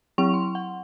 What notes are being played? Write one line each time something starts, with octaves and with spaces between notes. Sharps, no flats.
F#3 C4 E4 C#6 F7
C6
F#5